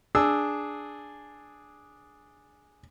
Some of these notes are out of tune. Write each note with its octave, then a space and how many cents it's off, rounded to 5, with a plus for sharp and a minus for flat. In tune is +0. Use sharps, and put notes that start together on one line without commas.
D4 +0 G#4 +0 E6 +0